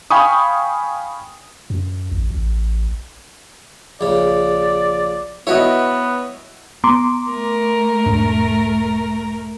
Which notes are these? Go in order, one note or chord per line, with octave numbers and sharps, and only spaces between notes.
F5 G5 G#5 B5 C#6 D#6
F#2
A1
A1
A#1 C#3 D5
B3 E4 F#4 B4 C#5 D#5
B3 A#5 C6 D6
A3 A#4
E1 G#2 D4